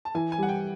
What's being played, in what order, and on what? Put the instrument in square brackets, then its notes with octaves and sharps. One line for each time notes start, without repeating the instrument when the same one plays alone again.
[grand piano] A5
[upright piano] E3 [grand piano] G#5
[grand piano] G#5
[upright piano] G3 [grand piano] F#5
[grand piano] G5